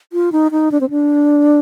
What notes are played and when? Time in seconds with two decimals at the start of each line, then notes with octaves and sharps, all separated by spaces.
0.13 F4
0.32 D#4
0.52 D#4
0.71 D4
0.81 C4
0.90 D4